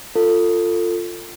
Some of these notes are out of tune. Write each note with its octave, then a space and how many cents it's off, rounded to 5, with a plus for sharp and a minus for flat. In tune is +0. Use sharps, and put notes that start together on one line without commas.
F4 +0 A4 +25